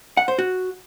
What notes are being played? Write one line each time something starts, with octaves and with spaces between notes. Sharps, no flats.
F#5
C5
F#4